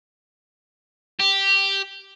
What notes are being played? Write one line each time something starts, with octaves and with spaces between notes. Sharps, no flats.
G4